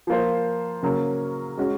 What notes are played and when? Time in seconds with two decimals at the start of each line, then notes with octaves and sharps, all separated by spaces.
0.07 F3 A#3 F4 C5
0.83 C#3 F#3 A#3 C#4
1.57 G#3 C#4 F#4